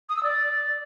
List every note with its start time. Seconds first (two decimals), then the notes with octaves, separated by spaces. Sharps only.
0.09 D#6
0.16 E6
0.23 D5